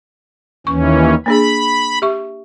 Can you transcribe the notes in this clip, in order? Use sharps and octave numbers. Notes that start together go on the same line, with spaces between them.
D#2 E3 C#4 C#6
A#3 D4 G#4 B5
G4 E5 C#6